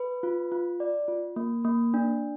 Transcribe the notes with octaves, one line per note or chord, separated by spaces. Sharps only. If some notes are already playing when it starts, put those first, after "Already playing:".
Already playing: B4
F4
F4
D5
F4
A#3
A#3
D4